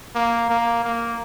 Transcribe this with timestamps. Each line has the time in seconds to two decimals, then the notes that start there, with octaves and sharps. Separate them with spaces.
0.15 A#3
0.50 A#3
0.85 A#3